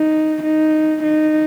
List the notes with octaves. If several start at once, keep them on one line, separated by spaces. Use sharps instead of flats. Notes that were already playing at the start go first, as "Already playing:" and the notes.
Already playing: D#4
D#4
D#4